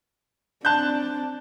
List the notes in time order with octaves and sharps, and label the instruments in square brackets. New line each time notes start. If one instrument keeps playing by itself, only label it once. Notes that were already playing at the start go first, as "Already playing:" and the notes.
[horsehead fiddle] C4 D4 [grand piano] A5 F#6 G6